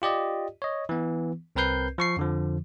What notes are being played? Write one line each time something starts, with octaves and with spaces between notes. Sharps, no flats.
F4 G4 D5 D#5
C#5 D#5
E3 B3
C2 C4 A#4 B4 G6 C7
F3 C#6 C7
F2 D3 F3